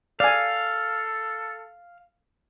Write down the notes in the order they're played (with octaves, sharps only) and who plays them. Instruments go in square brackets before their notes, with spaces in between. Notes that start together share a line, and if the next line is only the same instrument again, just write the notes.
[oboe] A4 [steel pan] D5 G#5 [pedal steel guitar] F5